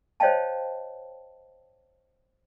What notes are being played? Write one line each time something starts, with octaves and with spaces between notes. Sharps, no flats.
C5 C#5 D#5 F5 G5 A5